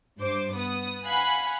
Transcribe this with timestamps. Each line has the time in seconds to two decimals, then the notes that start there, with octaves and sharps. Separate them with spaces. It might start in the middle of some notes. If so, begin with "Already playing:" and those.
0.20 G2 C5 D6
0.55 B3 D#6
1.05 F5 F#5 G#5 B5 F#6